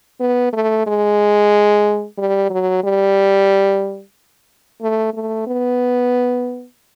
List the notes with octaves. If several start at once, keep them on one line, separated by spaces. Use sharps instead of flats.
B3
A3
G#3
G3
F#3
G3
A3
A3
B3